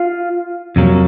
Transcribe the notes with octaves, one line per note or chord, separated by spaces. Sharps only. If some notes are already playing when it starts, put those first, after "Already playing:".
Already playing: F4 F5
F2 C3 F#3 A#3